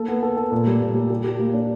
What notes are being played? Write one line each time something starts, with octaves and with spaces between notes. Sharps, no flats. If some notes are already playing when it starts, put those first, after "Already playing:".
Already playing: A#3 A4
B3
A4
A4
A#2
G3
A#2
G3
G4
G4
A#3
D4